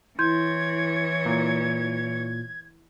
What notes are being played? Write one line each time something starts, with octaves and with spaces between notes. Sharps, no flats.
E3 E4 C#5 C6 G6 G#6
A#2